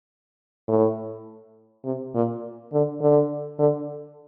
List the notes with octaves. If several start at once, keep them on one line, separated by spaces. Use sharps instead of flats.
A2
C3
A#2
D3
D3
D3